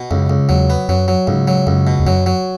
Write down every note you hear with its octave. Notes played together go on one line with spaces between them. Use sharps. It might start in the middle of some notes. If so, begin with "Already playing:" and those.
Already playing: B2
C#2 F#2
C#2
E2 F#3
B3
F#2 F#3
F#3
C#2 G#2
F#3
C#2 F#2
B2
E2
F#2 F#3
F#3